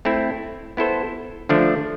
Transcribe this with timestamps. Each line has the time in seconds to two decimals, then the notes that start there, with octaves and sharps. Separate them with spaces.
0.05 A3 C4 E4
0.77 B3 E4 A4 C5
1.49 D3 F3 A3 D4